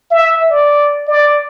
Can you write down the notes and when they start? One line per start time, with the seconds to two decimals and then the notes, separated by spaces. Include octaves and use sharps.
0.11 E5
0.50 D5
1.08 D5